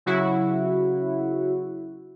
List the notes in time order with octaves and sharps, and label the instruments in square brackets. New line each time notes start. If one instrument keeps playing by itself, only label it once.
[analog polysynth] C#3 F#3 E4 F#4